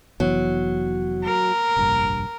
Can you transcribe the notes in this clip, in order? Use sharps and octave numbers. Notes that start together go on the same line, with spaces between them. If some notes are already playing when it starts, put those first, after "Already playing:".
F1 E3 F#3 B3
A#4
F1 A#1 G2